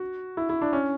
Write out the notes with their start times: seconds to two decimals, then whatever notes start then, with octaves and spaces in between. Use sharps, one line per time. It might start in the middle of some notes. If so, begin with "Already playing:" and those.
Already playing: F#4
0.37 E4
0.49 E4
0.62 D4
0.73 C#4